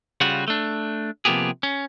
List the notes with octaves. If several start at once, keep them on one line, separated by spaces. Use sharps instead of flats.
C#3 G3 F4 F#4
A3 D4
C3 F3 A#3 B3 G4 G#4
C#4